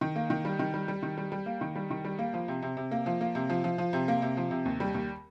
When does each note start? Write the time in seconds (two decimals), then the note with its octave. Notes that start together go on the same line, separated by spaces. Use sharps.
0.01 D#3
0.16 A#3
0.30 D#3
0.45 G3
0.59 D#3
0.74 G3
0.88 G3
1.03 D#3
1.18 G3
1.32 G3
1.46 A#3
1.61 D#3
1.76 G3
1.90 D#3
2.05 G3
2.19 A#3
2.34 F3
2.48 C3
2.62 C3
2.77 C3
2.91 A#3
3.06 F3
3.21 A#3
3.35 C3
3.50 F3
3.64 F3
3.78 F3
3.93 C3
4.08 A#3
4.22 C3
4.37 F3
4.51 C3
4.66 D#2
4.80 G3
4.94 D#2